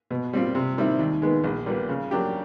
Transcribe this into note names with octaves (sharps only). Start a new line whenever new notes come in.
B2
G3 C4 F4
C3
D#3 G3 C4 E4
D#2
D#3 G#3 B3
A#1
A#2 G3 B3
C#3
F#3 A#3 D4 G4